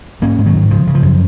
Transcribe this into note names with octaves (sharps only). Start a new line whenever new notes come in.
G#2 A#3 C#4
G#2
D#3 F#3
G#2
C#3 F3
C#3
F3
F#2